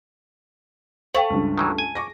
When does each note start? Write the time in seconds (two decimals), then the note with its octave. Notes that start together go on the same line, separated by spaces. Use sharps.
1.15 A3 C5 F5 G5
1.30 C#2 G2
1.58 D#3 E3 F#3
1.78 G#5
1.95 C#6 D6 A#6